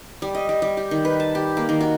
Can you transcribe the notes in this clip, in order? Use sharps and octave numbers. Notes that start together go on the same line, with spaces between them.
G3
D#5
G3
G3
G4
D#3
B4
A5
G4
A#3
D#3
F#4